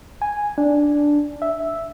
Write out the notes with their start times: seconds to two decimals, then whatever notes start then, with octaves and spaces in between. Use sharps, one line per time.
0.22 G#5
0.58 D4
1.42 E5